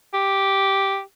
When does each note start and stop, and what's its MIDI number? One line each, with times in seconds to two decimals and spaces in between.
0.14 1.00 67